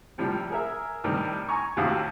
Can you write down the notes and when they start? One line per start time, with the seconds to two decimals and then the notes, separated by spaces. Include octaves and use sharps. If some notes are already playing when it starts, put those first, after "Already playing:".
0.18 A2 C3 F3 G3
0.50 G#4 A#4 E5
1.04 A2 C3 D#3 G3
1.49 G#5 A#5 C#6
1.77 D#2 A2 C3 F#4 F5 D#6